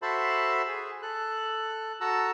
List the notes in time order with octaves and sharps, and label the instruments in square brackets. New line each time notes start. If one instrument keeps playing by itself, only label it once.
[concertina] F#4 A4 C5 E5 A5 B5
G#4
A4 F#6
F#4 A4 A5 A#5 E6